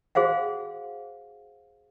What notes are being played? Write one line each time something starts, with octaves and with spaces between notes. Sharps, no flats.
F#4 G#4 C5 F5 F#5